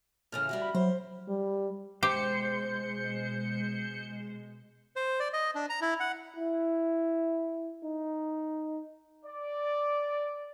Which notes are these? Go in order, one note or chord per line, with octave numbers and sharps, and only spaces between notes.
A2 C#3 E3 F6
G3 E4 F#4
B5
F#3 C5
G3
B2 G#3 G4 C5 G6 C#7
C5
D5
D#5
D4
A#5
E4
F#5
E4
D#4
D5